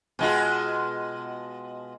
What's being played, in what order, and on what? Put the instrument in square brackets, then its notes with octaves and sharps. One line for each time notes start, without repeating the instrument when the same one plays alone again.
[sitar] B2 G#3 F4